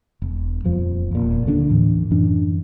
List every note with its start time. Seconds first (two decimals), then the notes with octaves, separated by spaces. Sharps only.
0.22 E1
0.64 D#1 F2 F3
1.11 E1 A#2
1.46 D#2 D3 A#3 D4
1.69 A2 E3
2.11 F#2 E3 D4